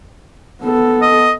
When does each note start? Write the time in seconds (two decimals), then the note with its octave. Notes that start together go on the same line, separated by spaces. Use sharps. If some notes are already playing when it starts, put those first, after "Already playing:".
0.62 B3 A4
1.02 D#5